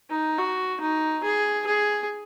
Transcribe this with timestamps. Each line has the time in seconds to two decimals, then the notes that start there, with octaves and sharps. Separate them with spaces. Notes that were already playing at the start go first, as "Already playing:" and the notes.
0.10 D#4
0.38 F#4
0.80 D#4
1.23 G#4
1.66 G#4